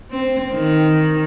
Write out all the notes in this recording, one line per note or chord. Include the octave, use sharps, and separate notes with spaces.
C4
D#3